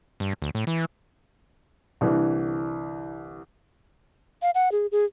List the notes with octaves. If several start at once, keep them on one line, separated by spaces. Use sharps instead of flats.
G2
D2
A2
E3
C2 D3 E3
F5
F#5
G#4
G#4